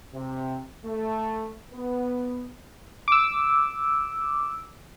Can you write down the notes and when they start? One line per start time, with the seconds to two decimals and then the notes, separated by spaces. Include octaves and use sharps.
0.14 C3
0.85 A3
1.73 B3
3.08 D6 E6